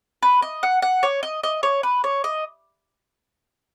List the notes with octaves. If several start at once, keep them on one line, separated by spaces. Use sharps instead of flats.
B4
D#5
F#5
F#5
C#5
D#5
D#5
C#5
B4
C#5
D#5